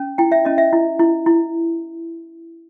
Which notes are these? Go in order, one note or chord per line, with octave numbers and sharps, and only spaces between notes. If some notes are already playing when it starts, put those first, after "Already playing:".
Already playing: C#4
E4 G5
E5
C#4 D#5
E5
E4
E4
E4